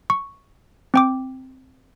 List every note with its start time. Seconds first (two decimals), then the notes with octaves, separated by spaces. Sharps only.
0.10 C#6
0.94 C4 G5 D6